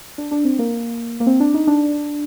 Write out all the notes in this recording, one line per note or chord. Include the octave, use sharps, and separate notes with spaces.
D4
D4
C4
A#3
A#3
C4
D4
D#4
D4